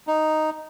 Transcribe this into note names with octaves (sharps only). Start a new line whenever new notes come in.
D#4